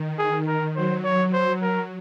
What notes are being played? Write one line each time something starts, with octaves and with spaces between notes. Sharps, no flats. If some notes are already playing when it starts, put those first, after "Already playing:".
Already playing: D#3
G#4
A#4
F#3 C5
C#5
C5
A#4